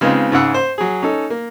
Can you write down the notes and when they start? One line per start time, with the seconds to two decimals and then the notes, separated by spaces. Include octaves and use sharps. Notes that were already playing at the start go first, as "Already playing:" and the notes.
0.01 C#3 G#3 B3 C4 D#4 F4
0.32 G#2 C#3 G#4 F#5 E6
0.54 C5
0.78 F#3 G#4
1.03 C#4 D#4 A4
1.30 A#3